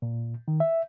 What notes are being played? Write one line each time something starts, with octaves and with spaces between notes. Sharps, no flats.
A#2
D#3
E5